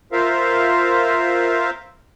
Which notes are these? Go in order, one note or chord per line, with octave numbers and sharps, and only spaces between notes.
F4 A#4 C5 E5 F5